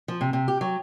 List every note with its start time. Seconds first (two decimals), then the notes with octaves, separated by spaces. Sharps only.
0.08 F3
0.21 C3
0.33 C3
0.48 G4
0.61 F#3